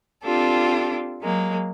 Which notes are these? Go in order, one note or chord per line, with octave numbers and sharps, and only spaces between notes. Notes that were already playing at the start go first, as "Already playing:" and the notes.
C4 D4 F4 G4 A4
F#3 G#3 A#3